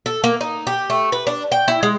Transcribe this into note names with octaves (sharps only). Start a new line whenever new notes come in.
A4
A#3
D#4
G4
A3
B4
D4
G5
E4
G#3